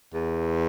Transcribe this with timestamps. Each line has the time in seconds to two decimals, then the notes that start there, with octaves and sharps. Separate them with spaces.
0.14 E2